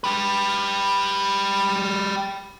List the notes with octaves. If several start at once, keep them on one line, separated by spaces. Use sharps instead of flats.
G4 B4